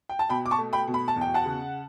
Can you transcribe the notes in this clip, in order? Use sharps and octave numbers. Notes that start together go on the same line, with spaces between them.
G5
A5
B2 G5 B5
D6
A5 C#6
A3
G5 B5
B2
B5
A5
E2
G5
F#5 A5
C#3